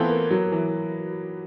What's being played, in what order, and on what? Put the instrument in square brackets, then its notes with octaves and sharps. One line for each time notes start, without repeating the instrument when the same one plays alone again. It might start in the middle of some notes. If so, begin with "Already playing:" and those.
Already playing: [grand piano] E3 A3 C4 F4 A4 [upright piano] B3
[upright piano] A#3
F#3
E3